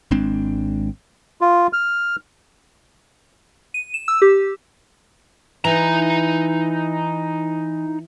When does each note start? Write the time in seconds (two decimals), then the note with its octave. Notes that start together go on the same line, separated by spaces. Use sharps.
0.11 G#1 G#3 C4 D4
1.41 F4
1.73 F6
3.74 D#7
3.94 E7
4.08 E6
4.22 G4
5.65 E3 D#4 A#5